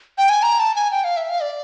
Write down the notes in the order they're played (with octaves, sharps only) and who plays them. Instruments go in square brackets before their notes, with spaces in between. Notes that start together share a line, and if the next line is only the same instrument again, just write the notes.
[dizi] G5
G#5
A#5
A5
G#5
G5
F5
E5
F5
D5